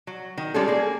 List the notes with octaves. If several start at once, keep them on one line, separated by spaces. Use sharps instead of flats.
F#3
D#3
G3 G#3 C#4 F4 A4
A#3 G#4